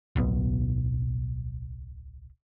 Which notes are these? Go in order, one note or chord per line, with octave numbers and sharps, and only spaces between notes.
D1 B1 B2